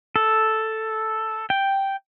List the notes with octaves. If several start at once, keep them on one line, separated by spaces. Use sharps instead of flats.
A4
G5